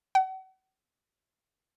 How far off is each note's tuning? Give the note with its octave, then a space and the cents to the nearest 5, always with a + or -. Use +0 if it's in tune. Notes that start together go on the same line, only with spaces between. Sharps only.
F#5 +40